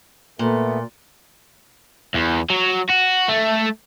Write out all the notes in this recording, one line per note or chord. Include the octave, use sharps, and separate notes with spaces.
A#2 A3 B3
E2
F#3
F#4
A3